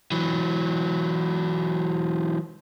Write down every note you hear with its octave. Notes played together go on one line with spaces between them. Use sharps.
E3 F#3